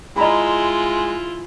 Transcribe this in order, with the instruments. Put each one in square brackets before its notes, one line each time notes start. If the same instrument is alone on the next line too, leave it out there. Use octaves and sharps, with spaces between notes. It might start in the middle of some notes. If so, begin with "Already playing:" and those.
[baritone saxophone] G#3 [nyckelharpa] E4 F4 [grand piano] D#5 A#5 B5